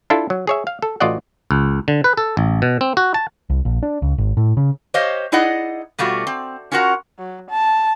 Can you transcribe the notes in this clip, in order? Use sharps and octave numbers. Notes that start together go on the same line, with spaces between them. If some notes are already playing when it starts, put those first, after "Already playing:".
D4 E4 F4 A4
F#3
G#4 C#5 E5
F5
A4
A1 F4 F#4 D5 D#5 F#5
C#2
D3
B4
A4
A1
B2
C4
F#4
A5
C2
A#1
D4
C#2
G#1
A2
C#3
G4 C5 C#5 D#5 F5
D#4 E4 G#4 D5 D#5 F#5
B2 G3 A3 F4 F#4
C4
C#4 F4 F#4 A#4 F#5
F#3
A5